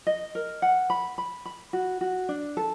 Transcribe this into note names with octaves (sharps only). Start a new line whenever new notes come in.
D#5
A#4
F#5
B5
B5
B5
F#4
F#4
D4
A4